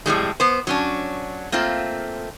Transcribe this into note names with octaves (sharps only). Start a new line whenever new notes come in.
F2 A2 G3 G#3
B3 C5
F#3 C#4 D4
A3 A#3 C4 F4